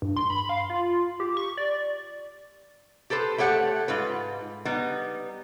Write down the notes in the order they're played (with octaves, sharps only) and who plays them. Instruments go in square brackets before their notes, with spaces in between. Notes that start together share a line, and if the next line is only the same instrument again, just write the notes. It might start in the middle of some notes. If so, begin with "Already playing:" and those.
[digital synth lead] G2
C6
B5
F5
F4
G4
C#6
D5
[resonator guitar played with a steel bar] G4 A4 B4 C5
A3 G4 C#5 F#5
G#2 F4 B4
G3 B3 D#4